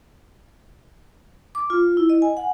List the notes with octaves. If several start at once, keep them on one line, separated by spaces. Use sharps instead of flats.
D6
F4
E4
D#5
G#5
F#5